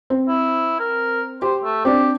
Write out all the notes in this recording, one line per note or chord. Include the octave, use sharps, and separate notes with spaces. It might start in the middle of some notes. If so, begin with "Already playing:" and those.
C4
E4
A#4
G4 C5
A3
C4 D4 G4